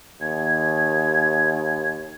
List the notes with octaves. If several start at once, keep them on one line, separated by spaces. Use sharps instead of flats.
D#2 G#6